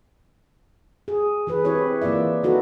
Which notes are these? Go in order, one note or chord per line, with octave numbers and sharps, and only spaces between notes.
G#4
E3 G#4 B4
C4 E4 G4 B4 C#5
E3 A#3 F4 D5 E5
D3 D#4 F#4 A4 B4